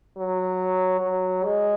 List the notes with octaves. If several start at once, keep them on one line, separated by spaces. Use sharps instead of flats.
F#3
F#3
G#3